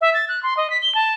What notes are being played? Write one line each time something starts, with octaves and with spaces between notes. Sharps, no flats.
E5
A6
F#6
C6
D#5
B6
G7
A5